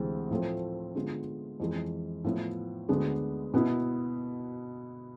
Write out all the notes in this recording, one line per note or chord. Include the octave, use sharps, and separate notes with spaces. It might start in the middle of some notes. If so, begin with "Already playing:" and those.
Already playing: D2 C3 E3 G#3 C4
A2 F3 A3 C4
D3 G#3 B3 F4
F2 E3 G#3
A2 F3 B3 E4
D2 D3 G#3 B3 D4
B2 B3 E4